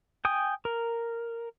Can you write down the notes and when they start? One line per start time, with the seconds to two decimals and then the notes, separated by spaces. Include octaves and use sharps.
0.25 G5 G#5 D#6
0.65 A#4